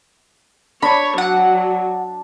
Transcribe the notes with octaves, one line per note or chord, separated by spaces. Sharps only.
D4 C#5 B5
F#3 F#5